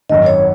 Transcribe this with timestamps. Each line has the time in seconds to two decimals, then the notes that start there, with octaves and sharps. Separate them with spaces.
0.09 G#1 F#2 D#3 D#5
0.26 C#5